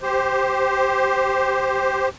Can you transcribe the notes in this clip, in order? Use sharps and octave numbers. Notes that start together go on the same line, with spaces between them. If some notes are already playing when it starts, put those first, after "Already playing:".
G4 C5